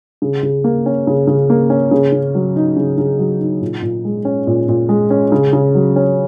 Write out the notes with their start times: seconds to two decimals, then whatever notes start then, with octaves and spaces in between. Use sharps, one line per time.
0.22 C#3
0.43 C#3
0.64 A#3
0.86 C#4
1.07 C#3
1.27 C#3
1.50 A#3
1.70 C#4
1.91 C#3
2.12 C#3
2.35 F#3
2.56 D#4
2.76 C#3
2.98 C#3
3.19 F#3
3.41 D#4
3.61 A#2
3.82 A#2
4.05 G#3
4.25 C#4
4.47 A#2
4.69 A#2
4.89 G#3
5.10 C#4
5.32 C#3
5.53 C#3
5.75 F#3
5.96 C#4